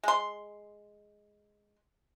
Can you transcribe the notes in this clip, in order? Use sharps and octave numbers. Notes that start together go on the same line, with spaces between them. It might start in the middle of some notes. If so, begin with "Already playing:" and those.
G#3 C6